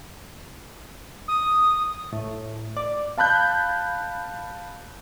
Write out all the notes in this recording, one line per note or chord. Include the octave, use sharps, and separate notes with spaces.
D#6
A2
D5
F5 A5 B5 F#6 G6